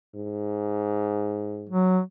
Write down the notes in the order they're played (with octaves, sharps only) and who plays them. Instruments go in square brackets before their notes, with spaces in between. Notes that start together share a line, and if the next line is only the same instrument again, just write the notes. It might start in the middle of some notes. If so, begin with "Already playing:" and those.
[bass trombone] G#2
[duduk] F#3